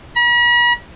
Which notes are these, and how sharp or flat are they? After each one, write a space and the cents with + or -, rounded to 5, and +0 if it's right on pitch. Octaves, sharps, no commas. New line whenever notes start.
B5 -45